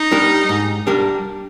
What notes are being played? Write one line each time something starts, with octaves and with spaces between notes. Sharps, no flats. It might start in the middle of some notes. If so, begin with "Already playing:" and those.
Already playing: D#4
G3 D4 G4 A#4
G#2
G3 D4 G4 A#4